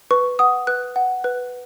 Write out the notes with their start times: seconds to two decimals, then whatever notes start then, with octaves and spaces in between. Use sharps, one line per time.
0.11 B4 C#6
0.39 F#5 D#6
0.67 B4 F#6
0.96 F#5
1.24 B4 F#6